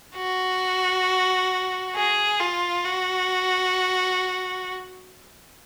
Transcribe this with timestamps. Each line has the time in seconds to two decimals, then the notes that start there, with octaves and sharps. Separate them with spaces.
0.16 F#4
1.96 G#4
2.40 F4
2.85 F#4